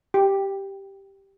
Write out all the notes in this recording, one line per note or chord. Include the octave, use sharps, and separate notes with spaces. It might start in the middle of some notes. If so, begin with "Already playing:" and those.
G4